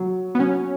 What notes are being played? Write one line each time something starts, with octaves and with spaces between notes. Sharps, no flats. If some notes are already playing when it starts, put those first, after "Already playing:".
Already playing: F#3
B3
F#3 C#4